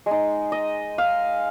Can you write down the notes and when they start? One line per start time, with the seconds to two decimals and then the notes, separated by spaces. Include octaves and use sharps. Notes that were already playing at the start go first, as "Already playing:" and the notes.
0.06 G#3 D#4
0.52 D#5
0.98 F5